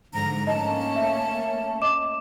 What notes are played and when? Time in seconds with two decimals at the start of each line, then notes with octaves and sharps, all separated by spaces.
0.14 G#2 D3 F3 A#5
0.47 A3 A#3 C#4 D#5 A5
0.96 E5
1.82 D#5 D6 E7